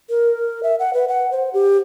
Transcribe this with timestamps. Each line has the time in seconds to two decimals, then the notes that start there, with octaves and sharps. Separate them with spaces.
0.10 A#4
0.63 E5
0.79 F#5
0.94 B4
1.08 F#5
1.31 C5
1.54 G4